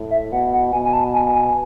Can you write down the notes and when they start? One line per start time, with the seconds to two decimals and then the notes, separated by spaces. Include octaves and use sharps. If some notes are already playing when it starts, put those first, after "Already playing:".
Already playing: A2
0.11 E5
0.32 B2 F#5
0.53 F#5
0.73 B2 G#5
0.85 G#5
0.93 A5
1.14 G#5
1.34 G#5